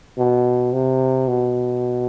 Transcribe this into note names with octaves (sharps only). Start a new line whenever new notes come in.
B2
C3
B2